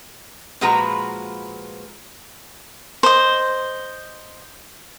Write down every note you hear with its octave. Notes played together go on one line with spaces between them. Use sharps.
A#2 F3 G#3 F#4 B4 A#5
C5 D#5